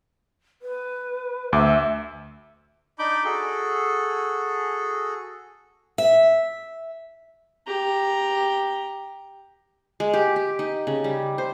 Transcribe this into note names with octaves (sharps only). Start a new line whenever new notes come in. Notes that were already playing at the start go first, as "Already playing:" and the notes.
B4
D2 E5 D6
D4 D#4 B5 D6 G6
F#4 G#4 A4
E5
G4 A#5
G#3
G4
G4
D#4
C#3
G3
C5